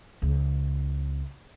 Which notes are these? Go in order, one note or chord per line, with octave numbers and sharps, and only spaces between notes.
C#2